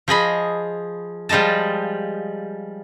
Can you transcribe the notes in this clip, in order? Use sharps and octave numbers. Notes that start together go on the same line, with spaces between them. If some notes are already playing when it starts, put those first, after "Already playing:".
F3 G#4 D#5 B5
F3 G3 G#3 D#5 A5